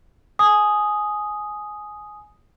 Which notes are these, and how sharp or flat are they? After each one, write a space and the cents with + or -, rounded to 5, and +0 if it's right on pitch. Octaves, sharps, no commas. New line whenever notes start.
G#5 +15 D#6 +0